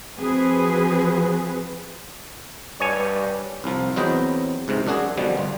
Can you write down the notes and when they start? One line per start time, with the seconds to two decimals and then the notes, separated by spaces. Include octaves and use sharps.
0.19 F3 C4 F#4 G#4 B4
2.80 G2 C#5 G#5
3.64 C2 F3
3.96 E2 F#3 C4 B4 D#5 G5
4.68 C#2 G#2 C3
4.87 F#2 D4 F#4 G#4
5.17 B2 D3 F3 G3
5.37 G1